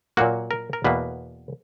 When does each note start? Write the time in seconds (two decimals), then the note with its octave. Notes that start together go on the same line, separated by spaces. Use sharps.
0.17 A#2 F#3 A#3 F#4
0.51 A#4
0.73 A#4
0.84 E2 B2 A#3 B4